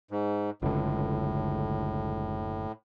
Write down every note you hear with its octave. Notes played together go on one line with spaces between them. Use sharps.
G#2
F#1 C#2 A2 D3